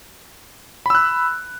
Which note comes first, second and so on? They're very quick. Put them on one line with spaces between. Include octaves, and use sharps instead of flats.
B5 E6 F#6